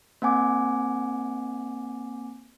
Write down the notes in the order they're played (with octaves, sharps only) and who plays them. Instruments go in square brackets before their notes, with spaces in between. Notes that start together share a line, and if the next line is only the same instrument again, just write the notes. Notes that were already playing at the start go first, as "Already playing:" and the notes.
[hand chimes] A#3 C4 F#5 G#5 D6